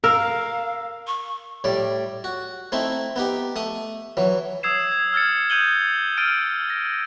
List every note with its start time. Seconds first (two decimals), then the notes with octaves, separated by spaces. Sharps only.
0.04 A#4 F5 E6
1.07 C#6
1.64 A2 G3 D5
2.24 F#4
2.72 A3 C4 D#4 E4
3.16 B3 D#4 G4
3.56 A3 D#6
4.17 E3 F#3
4.63 D#6 E6 G#6 C7 E7
4.92 G#6
5.13 E6 F6 G#6 A6 C#7
5.50 D#6 G6 G#6 D#7 F#7 G7
6.17 E6 F6 A6 D7 D#7
6.70 A#6